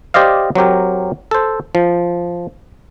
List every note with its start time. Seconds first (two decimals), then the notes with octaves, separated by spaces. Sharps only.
0.14 G4 C5 D5 D#5 F5
0.55 F#3 C4 G4 A#4
1.31 A4 C5
1.75 F3